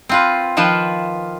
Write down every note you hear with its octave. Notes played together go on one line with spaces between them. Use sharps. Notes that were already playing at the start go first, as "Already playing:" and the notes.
C4 F4 B4
D#3 F3 F4 B4